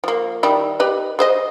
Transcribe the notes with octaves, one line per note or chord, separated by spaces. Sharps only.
F3 A#3
D#3 G3 E4
G4 B4 D#5
G#4 C5 D#5